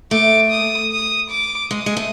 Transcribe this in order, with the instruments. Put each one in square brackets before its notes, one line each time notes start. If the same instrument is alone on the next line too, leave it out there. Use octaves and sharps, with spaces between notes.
[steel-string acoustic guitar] A3 [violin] D6
[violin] D#6
D#6
D6
[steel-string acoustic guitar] G#3 [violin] D#6
[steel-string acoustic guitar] G#3
A3